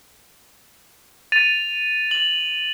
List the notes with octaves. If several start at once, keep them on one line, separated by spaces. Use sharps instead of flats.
A6 D#7 F7
F#7